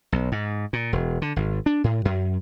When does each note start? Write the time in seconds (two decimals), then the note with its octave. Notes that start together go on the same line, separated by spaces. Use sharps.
0.12 B1
0.32 G#2
0.73 A#2
0.93 E1
1.22 D3
1.36 G#1
1.66 D4
1.84 A2
2.05 F#2